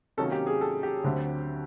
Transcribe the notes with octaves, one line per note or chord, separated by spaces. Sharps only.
C3 D#3 F#3 A#3 C#4 A4
G4
G#4
A4
G4
D2 D3 F#3 A3 C4